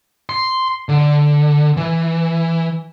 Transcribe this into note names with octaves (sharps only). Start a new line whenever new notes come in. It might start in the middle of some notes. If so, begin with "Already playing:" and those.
C6
D3
E3